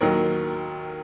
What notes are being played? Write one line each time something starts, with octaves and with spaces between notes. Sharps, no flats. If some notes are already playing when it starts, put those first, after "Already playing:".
D#2 D#3 F#3 A#3 A#4